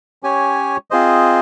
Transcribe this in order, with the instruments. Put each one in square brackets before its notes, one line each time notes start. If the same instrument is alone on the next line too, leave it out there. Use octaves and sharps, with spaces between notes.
[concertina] C#4 G4 C#5 G#5
C4 F4 G#4 C5 D#5